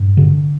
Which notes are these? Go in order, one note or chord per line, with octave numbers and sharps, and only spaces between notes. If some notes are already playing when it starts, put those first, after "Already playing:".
Already playing: G2
D3